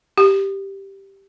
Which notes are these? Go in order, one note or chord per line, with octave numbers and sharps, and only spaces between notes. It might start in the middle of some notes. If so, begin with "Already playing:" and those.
G4